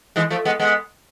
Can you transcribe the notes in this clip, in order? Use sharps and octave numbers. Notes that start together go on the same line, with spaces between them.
E3 G#3
F3 A3
G#3 B3
G#3 B3